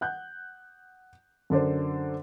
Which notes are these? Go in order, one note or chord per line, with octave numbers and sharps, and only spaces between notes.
F#5 F#6 G6
F#2 D3 D4 C5